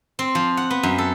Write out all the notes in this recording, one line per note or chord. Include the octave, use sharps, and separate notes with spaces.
C4
F3
F#5
B3
F#2
A4